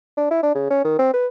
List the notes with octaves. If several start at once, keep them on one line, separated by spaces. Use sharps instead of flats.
D4
E4
D4
C#3
C#4
D#3
C4
B4